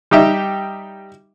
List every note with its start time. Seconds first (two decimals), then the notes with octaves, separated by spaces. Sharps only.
0.11 G3 D#4 G4 E5